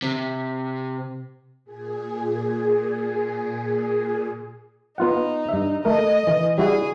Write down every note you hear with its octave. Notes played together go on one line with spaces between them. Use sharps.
C3
A#2 G#4
B3 D#4 F4 F#5
G2 E5
A3 A#4 D#5
E3
G3 E4 F#4 G#4